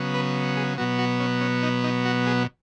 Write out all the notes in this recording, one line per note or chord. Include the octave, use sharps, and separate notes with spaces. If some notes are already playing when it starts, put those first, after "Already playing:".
Already playing: C#3 F#3 B3
B4
G#4
B2 F#3 B3 F#4
F#4
C#4
C#4
D#4
D#4
F#4
G#4